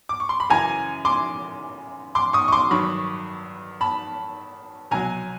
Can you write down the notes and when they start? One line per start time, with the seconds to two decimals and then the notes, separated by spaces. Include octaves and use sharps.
0.09 D6
0.20 C#6
0.29 C6
0.40 B5
0.49 F#2 C#3 E3 G#5 A#5
1.05 C6 D6
2.15 C6 D6
2.33 C#6 D#6
2.48 C#6
2.52 C6 D6
2.71 G2 D#3 F#3 B5 C#6
3.81 A5 B5
4.91 C2 B2 F#3 G#5 A#5